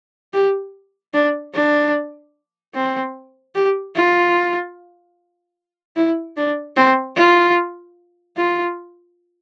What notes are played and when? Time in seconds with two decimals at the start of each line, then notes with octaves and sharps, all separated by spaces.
0.33 G4
1.14 D4
1.54 D4
2.75 C4
3.55 G4
3.95 F4
5.96 E4
6.37 D4
6.76 C4
7.17 F4
8.37 F4